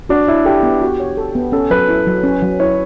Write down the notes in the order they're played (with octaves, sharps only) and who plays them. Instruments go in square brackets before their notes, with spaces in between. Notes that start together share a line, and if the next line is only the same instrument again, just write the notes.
[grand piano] D4 [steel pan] F#4
[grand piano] E4 [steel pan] C#5
[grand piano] G4 [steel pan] A4
[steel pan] B3
F#4
C#5
A4
B3
[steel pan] C#4 [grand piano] A4
[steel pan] F#3 [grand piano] B4
[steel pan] E4
F#3
C#4
F#3
[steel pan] E4 [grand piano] C#5